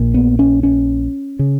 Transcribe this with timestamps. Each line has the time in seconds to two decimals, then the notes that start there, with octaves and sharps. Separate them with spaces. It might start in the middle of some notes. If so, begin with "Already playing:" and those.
Already playing: A#1 A#2
0.14 B3
0.39 C#4
0.63 C#4
1.39 C#3